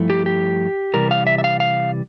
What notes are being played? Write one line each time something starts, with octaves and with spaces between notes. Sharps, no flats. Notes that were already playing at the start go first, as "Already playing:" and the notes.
Already playing: G2 F3 A3 E4
G4
G4
C3 E3 G3 A#4
F5
E5
E5
F5
F5